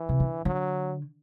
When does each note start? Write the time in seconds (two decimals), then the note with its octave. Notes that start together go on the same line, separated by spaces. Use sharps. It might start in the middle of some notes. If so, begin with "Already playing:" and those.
Already playing: E3
0.09 C3
0.20 D3
0.45 D3 F#3